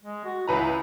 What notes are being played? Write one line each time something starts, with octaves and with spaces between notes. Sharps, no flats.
G#3
F#4
C#2 E4 B4 A#5